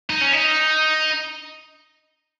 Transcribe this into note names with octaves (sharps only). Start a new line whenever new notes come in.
D#4
C#4
D#4